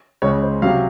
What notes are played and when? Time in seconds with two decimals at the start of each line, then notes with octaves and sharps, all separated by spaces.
0.22 C#2 C#3 G#3 C#5
0.42 C5
0.62 C3 F#3 F5